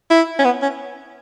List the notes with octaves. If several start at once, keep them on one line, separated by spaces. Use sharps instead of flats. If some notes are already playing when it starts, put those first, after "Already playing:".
E4
C#4
B3
C#4